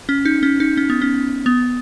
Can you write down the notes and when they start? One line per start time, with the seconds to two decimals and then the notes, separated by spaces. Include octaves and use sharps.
0.09 C#4
0.25 D#4
0.43 C#4
0.60 D#4
0.77 C#4
0.90 B3
1.02 C#4
1.46 B3